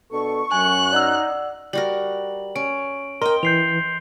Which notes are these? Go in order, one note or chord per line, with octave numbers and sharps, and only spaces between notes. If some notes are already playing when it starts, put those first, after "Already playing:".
B2 D4 A4 C#6
F#2 G#5 F#6
D#4 D5 F#5 E6
G3 F#4 A#4 F#7
C#4 D7
A#4 D#5 G5 C6 G7
E3 G6 C7 F7